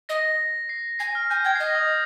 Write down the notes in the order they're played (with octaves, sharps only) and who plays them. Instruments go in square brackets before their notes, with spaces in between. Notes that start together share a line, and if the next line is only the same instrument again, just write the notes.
[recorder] D#5 [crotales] A#6
[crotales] C7
[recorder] G#5 [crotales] C7
[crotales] F6
[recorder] G#5 [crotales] G6
[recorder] G5 [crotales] G#6
[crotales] C7
[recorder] D#5 [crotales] A#6
[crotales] D#6